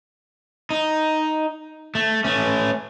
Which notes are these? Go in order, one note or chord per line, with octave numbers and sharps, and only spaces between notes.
D#4
A3
A3 C#4